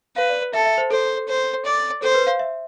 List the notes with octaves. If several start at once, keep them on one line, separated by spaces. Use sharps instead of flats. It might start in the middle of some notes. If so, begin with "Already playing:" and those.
B4 F5
D5
A4 E5
E5
C5
A4 C5
C5
D5
A4 C5
B4
F5
E5